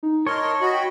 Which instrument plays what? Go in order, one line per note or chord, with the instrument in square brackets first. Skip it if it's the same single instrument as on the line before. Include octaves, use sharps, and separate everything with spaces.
[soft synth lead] D#4
[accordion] A#4 D#5 C6 [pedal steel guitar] C#5 [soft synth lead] A5
[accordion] F#4 D#5 B5
[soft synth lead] G5